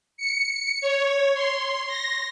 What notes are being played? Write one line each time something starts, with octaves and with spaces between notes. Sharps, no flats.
C#7
C#5
C6
A#6